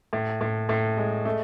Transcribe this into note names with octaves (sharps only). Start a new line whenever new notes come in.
A2
A2
A2
G#3
A3